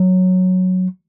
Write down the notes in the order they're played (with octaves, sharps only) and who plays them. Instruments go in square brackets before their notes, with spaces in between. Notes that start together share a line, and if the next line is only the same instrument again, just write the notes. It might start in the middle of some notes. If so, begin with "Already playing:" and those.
Already playing: [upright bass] F#3